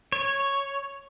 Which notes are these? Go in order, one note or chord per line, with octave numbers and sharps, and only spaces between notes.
C#5